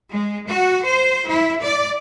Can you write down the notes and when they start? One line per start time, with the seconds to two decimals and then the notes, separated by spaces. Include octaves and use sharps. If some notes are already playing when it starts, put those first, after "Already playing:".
0.12 G#3
0.48 F#4
0.85 C5
1.27 E4
1.62 D5